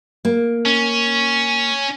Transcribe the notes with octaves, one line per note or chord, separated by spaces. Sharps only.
A#3
C#4